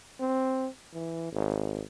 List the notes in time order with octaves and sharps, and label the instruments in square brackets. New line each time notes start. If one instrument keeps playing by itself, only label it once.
[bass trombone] C4
E3
G#1